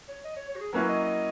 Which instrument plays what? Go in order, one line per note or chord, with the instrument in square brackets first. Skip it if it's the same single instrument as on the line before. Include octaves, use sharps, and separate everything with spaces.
[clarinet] C#5
D#5
C#5
C#5
F#4
G#4
[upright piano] F#3 A#3 C#4 E4 [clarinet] B4
[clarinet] D#5
D#5